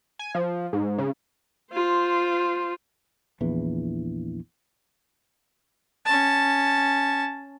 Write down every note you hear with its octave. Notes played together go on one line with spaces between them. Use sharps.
G#5
F3
G#2
C#3
F4 C5
A#1 E2 E3
C#4 A5